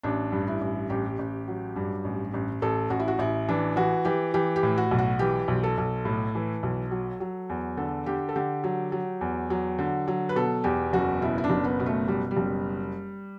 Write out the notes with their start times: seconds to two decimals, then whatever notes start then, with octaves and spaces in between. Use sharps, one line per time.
0.03 A1 D4
0.32 G2
0.48 E4
0.61 A1
0.90 A1 G4
1.19 A1
1.48 F#3
1.76 G2
2.05 A1
2.34 A1
2.62 A1 A4
2.90 A1 F#4
3.00 E4
3.08 F#4
3.19 A1 E4
3.49 E3 D4
3.76 E3 F#4
4.05 E3 G4
4.34 E3 G4
4.56 G4
4.63 A2
4.77 F#4
4.91 B1
4.99 F#4
5.19 E3 G4
5.48 B1
5.63 A4
5.78 B1
6.05 A2
6.35 E3
6.63 B1
6.91 F#3
7.20 F#3
7.49 E2
7.77 D3 A4
8.06 D3 G4
8.29 A4
8.36 D3 G4
8.64 F#3
8.92 F#3
9.21 E2
9.50 F#3
9.79 D3
10.08 F#3
10.29 B4
10.36 B2 A4
10.64 E2 G4
10.93 F#1 F#4
11.22 B2 E4
11.38 E4
11.44 D4
11.50 F#1
11.64 B3
11.80 B2
11.86 A3
12.08 B2 G3
12.31 G3
12.37 F#1